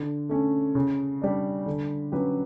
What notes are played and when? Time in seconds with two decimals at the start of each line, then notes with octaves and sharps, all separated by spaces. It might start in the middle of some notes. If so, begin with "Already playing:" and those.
Already playing: D3
0.29 A3 C#4
0.75 C#3
1.22 G3 D4
1.66 D3
2.12 F#3 C#4 G4 B4